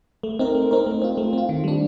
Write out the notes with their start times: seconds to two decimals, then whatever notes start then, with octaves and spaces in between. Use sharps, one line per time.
0.23 A3
0.39 C4 D#4 A#4
0.55 A3
0.71 C4 D#4 A#4
0.86 A3
1.02 C4 F4
1.17 A3
1.33 C4 F4
1.49 D#3
1.64 G3 D4